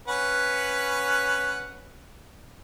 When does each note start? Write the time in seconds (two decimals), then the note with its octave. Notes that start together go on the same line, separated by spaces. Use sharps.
0.08 C#4 B4 F#5